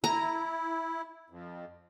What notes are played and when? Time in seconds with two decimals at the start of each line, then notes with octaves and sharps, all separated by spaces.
0.04 E4 A#5
1.30 F2